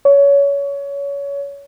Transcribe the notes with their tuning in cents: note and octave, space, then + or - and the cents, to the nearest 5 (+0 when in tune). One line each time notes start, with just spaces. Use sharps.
C#5 +25